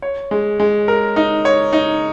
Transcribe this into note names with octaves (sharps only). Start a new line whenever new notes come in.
C#5
G#3
G#3
A#4
D#4
C#5
D#4